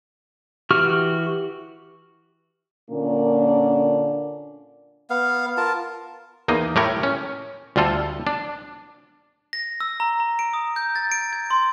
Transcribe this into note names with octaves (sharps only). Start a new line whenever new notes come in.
E3 F#4 G4 C#6 F6
A#2 D3 A#3 C#4 D4
B3 F5
F4 A#4 A5
E2 A#3 D#4 D#5
A2 G4 A#4 C#5
C#4
D2 G3 F4 A4
D4
A#6
E6
A#5
A#5
D7
D#6
G6
A6
D7
G#6
C6